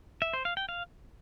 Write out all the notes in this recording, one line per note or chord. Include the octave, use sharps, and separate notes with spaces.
E5
C5
F5
G5
F5